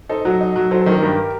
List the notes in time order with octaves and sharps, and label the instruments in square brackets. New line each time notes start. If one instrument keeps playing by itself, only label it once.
[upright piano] D#4 [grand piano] A4 C5
[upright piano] F#3 [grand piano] F#4 A4
[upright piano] D#4
F#3
[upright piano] F#3 [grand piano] A4 C5
[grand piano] A4 C5
[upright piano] D#3
[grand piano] G4 A#4
[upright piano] G2 [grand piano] G4 A#4